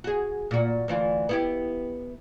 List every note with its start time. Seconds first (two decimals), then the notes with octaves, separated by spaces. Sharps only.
0.04 F#4 G#4
0.51 A#2 F#4
0.88 D2 E3 F4
1.29 B3 E4 G4